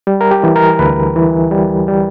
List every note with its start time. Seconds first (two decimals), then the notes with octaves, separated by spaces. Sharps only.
0.07 G3
0.21 A#4
0.31 G4
0.44 E3
0.56 A#4
0.79 D2 B4
1.16 E3
1.51 G3
1.88 G3